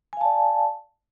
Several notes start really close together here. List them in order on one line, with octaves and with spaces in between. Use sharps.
G#5 F5 A5 D5